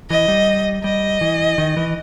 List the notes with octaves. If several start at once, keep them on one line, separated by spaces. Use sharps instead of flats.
E3 D#5
G3
G3 D#5
E3
D#3
E3